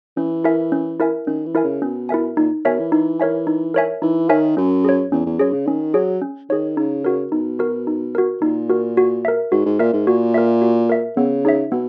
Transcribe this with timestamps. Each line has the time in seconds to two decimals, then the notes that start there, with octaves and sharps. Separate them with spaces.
0.17 E3 C#4
0.44 E4 A#4 E5 G#5
0.72 C#4
1.00 E4 A#4 E5 G#5
1.27 D#3 C#4
1.46 E3
1.55 E4 A#4 E5 G#5
1.64 C#3
1.82 B2 C#4
2.09 E4 A#4 E5 G#5
2.37 A#2 D#4
2.65 B2 A#4 C#5 E5 G#5
2.79 E3
2.92 E3 D#4
3.20 A#4 C#5 E5 G#5
3.47 D#4
3.74 A#4 C#5 E5 G#5
4.02 E3 D#4
4.29 D#3 A#4 C#5 E5 G#5
4.57 F#2 C#4
4.85 G#4 C#5
5.12 E2 C#4
5.26 E2
5.39 F#2 G#4 C#5
5.53 C#3
5.67 D#3 C#4
5.94 F#3 G#4 C#5
6.22 C#4
6.49 D#3 G#4 C#5
6.77 C#3 D#4
7.05 F#4 A#4
7.32 B2 D#4
7.59 F#4 A#4
7.87 D#4
8.15 F#4 A#4
8.42 A#2 D#4
8.69 F#4 A#4
8.97 F#4
9.25 A#4 E5
9.52 G#2 F#4
9.66 G#2
9.79 A#2 A#4 E5
9.93 G#2
10.07 A#2 F#4
10.34 A#4 E5
10.62 F#4
10.89 A#4 E5
11.17 C#3 B3
11.45 D#4 G#4 C#5 E5
11.72 B2 B3